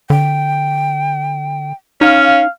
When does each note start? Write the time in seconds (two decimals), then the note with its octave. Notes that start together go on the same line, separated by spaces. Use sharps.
0.10 D3 G5
2.01 C#4 D#4 F5